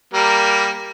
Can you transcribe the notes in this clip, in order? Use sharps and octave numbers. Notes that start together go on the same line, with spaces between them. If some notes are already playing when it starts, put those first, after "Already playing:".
G3 A#3 A#4